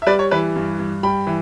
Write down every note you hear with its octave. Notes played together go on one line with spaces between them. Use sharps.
E5
G3 B4 D5
C#5
E3 B4
G2
G2
G3 G5 B5
E3